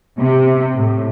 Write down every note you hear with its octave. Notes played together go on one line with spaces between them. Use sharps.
C3
A2